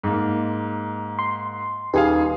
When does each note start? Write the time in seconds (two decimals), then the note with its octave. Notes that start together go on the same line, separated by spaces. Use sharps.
0.03 G#2 A#3
1.19 C6
1.93 D#1 D#4 G4 G#4 B4 F5